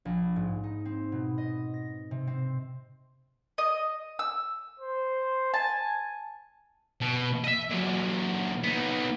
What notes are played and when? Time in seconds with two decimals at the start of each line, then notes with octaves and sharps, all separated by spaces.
0.05 A#1
0.36 G#2
0.64 D#4
0.85 C4
1.12 B2
1.38 D#5
1.74 A#6
2.11 C3
2.27 C4
3.58 D#5
4.19 E6
4.80 C5
5.54 G#5 A5
7.01 B2
7.44 D#5 E5
7.70 A#2 F#3
8.63 B3 D#4